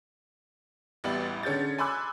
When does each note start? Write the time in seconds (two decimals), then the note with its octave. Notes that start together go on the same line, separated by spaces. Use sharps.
1.04 A1 G3 B3 E5 A6 F#7
1.43 D3 C#4 G#4 G6 A6
1.78 G#5 B5 C6 D6 E6 F#6